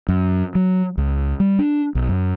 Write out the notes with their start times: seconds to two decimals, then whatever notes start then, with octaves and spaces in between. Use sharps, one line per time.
0.08 F#2
0.55 F#3
0.98 C#2
1.40 G3
1.59 D4
1.95 B1
2.09 F#2